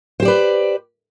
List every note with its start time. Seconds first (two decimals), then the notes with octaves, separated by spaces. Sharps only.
0.20 C5
0.22 G4
0.25 D5
0.28 B4